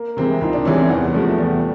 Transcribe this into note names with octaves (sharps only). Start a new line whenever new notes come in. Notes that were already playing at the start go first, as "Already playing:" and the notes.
Already playing: A#3
C3 E3 G#3 C4
C#2 D#4
D4
C3 E3 G#3 C#4
C4
E2 B3
C3 F3 G#3 A3
E2 G3